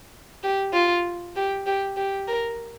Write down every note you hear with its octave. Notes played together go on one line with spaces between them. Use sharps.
G4
F4
G4
G4
G4
A#4